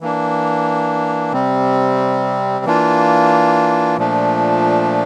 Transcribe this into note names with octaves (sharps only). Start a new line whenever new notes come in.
E3 A#3 D4
C3 G3 C4
E3 A#3 D4 F4
A#2 F3 A3 D4